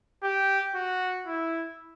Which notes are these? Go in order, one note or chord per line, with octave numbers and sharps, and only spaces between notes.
G4
F#4
E4